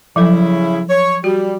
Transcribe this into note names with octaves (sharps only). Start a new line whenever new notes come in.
C#3 F3 F#3 E4 A4
C#5
G3 F#4